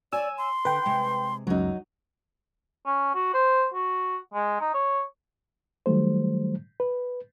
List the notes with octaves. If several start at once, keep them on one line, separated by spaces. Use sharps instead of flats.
C#5 D5 G#5 E6
C6
D3 B4 G5
C3 G#3
C#2 F#2 F#3 D#4
C#4
F#4
C5
F#4
G#3
D#4
C#5
D#3 F#3 G3 A3 C5
B4